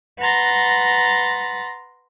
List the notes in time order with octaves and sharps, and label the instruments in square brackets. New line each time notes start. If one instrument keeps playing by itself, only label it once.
[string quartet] B4 F#5 A#5 C6 A6 A#6